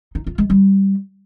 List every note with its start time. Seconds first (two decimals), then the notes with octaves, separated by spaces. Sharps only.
0.15 D#4
0.27 F4
0.38 G#3
0.50 G3